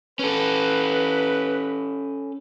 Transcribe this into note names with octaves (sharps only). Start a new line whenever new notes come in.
C#4 A4 B4